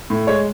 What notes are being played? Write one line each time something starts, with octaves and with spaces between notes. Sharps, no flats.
A2
G#3 C#5